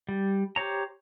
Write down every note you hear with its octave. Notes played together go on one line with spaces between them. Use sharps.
G3
G4 C5 C#5 A#5